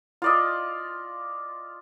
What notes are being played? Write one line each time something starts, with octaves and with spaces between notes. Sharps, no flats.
F4 D5 D#5